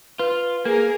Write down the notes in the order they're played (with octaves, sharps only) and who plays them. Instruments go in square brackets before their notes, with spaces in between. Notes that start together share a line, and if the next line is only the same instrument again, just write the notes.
[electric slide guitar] F4 [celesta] B4
[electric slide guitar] A#3 [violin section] G#4 A#4